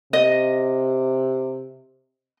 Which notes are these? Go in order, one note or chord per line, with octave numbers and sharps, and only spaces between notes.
C3 D#5